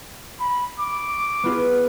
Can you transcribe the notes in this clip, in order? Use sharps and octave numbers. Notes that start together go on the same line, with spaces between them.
B5
D6
B3 F4 G#4